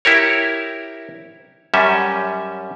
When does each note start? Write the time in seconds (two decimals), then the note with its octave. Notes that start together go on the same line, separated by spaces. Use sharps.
0.05 E4 G4 A#4 C#5
1.74 F#2 G3 C#4 E5